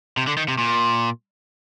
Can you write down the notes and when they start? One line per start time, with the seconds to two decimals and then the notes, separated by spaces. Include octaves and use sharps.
0.17 C3
0.27 D3
0.37 D#3
0.48 C3
0.58 A#2